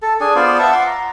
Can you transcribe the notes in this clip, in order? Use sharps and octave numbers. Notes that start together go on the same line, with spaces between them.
A4
D4 G#4 G#5
B3 F4 C5 D5
E5 F#5 A5
F#5 C6 D6
A#5